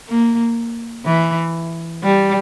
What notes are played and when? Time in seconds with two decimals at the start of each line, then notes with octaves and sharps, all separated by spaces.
0.09 A#3
1.06 E3
2.03 G3